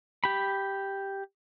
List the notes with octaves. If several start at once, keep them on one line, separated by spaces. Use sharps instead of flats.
G4 B5